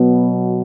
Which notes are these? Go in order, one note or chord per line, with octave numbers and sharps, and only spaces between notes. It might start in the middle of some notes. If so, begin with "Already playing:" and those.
Already playing: B2 F#3 B3